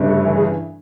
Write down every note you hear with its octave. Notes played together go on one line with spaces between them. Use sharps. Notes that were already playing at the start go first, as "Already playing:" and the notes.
Already playing: G1 G2 C#3
A3
E3
G#4